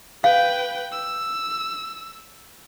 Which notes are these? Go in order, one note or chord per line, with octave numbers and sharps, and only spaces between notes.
B4 F5 G5
E6